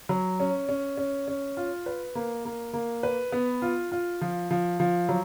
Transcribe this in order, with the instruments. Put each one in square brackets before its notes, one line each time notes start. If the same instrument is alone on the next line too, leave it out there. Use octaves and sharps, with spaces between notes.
[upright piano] F#3
C#4
C#4
C#4
C#4
F4
B4
A#3
A#3
A#3
B4
B3
F4
F4
F3
F3
F3
F#3